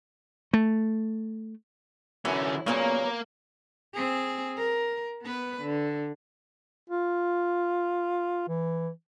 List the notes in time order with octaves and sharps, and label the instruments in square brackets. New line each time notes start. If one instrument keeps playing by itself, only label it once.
[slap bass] A3
[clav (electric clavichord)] F#2 E3 [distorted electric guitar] D3 C#4 [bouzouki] E4
[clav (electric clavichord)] A#2 C#3 [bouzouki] F#3 B3 C#5 [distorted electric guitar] A#3 A#4
[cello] C4 G#4
A#4
B3 B4
D3
[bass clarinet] F4
E3